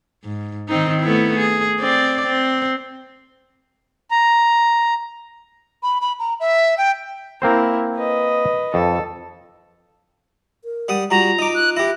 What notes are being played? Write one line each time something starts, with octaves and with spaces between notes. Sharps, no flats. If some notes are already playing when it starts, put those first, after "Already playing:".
G#2
D#3 C4 D#4
A3 B3 E4
G#4
C4 D5
C4
A#5
B5
B5
A#5
E5
G5
A#3 C4 E4 A#4 C5
B4 D#5
F2 A4
A#4
G3 F#5 D#6
G3 F4 F#4 A#5
D#4 D6
F#6
E4 G4 A#6